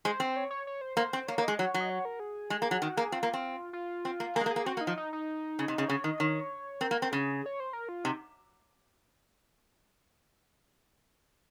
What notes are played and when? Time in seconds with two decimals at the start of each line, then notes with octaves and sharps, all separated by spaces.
0.05 G#3 C5
0.20 C4
0.36 C#5
0.51 C#5
0.67 C#5
0.81 C5
0.97 A#3 C5
1.13 C4
1.27 A#3 C#5
1.38 A#3
1.43 G#3 D#5
1.59 F#3 C#5
1.74 F#3
1.81 D#5
1.90 C#5
2.05 A#4
2.20 G#4
2.50 G#3
2.62 A#3
2.71 F#3
2.82 D#3 F#4
2.97 A#3 G#4
3.12 C4 F4
3.23 A#3
3.34 C4
3.73 F4
4.05 C4
4.20 A#3
4.35 A#3 G#4
4.41 G#3
4.46 A#3
4.51 G#4
4.56 A#3
4.66 C4 F#4
4.77 A#3
4.81 D#4
4.87 F3
4.97 D#4
5.13 D#4
5.59 C#3
5.68 C3
5.78 C#3
5.88 C#3 C#5
6.04 D#3 D#5
6.20 D#3 C#5
6.81 C4 A#4
6.91 A#3
7.02 C4
7.11 C#3 G#4
7.46 C#5
7.60 C5
7.73 A#4
7.89 F4
8.04 C3 D#4